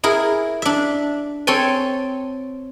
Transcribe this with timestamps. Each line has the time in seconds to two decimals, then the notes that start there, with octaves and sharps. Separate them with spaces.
0.04 E4 G#4 A#4
0.62 D4 E5
1.47 C4 A4 C#5 G5 G#5